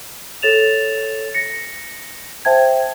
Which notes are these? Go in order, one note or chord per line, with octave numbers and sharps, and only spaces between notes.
A4 C#5 A6 E7 F7
A#6 C#7
C5 E5 G5 A5 G#6